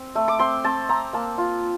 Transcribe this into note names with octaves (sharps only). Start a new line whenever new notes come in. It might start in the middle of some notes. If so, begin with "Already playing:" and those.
Already playing: C4
A3
D6
C4 C6
C4 A5
C4 A#5
A#3 A5
F4